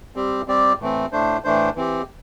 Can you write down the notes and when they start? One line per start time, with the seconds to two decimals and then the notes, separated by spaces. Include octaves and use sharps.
0.16 G3 C4 G4
0.48 G3 C4 G4 D5
0.80 A2 E3 A3 C4
1.12 A2 A3 D4 C5
1.44 A2 E3 A3 D4 C5
1.76 E3 C4 G4